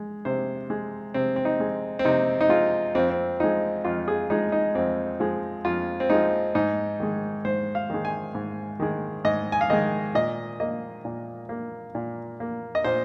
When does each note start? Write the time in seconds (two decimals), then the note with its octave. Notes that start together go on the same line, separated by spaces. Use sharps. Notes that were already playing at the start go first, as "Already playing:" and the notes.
Already playing: G#3
0.25 C3 C5
0.70 G#3
1.14 C3 C4
1.36 C4
1.45 D#4
1.60 G#3
1.99 C4
2.05 C3 D#4
2.41 D#4
2.49 G#3 F4
2.95 F2 C4
3.10 C4
3.40 F3 G#3 D#4
3.84 F2 F4
4.08 G#4
4.30 F3 G#3 D#4
4.52 D#4
4.75 F2 C4
5.20 F3 G#3
5.65 F2 F4
6.00 C4
6.10 F3 G#3 D#4
6.55 G#2 D#4
7.00 D#3 G#3
7.45 G#2 C5
7.75 F5
7.90 D#3 G#3
8.05 G#5
8.35 G#2
8.80 D#3 G#3
9.25 G#2 D#5
9.52 G#5
9.61 F5
9.70 D#3 G#3 D#5
10.15 A#2 D#5
10.60 A#3 D#5
11.05 A#2
11.49 A#3
11.95 A#2
12.40 A#3
12.75 D#5
12.84 A#2 C5